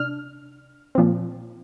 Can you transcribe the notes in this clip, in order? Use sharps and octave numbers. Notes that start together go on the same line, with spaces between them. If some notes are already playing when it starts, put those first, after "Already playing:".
Already playing: C3 D4 F6
A#2 F3 C4